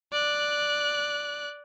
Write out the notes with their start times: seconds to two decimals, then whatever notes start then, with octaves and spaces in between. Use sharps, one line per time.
0.12 D5 F#6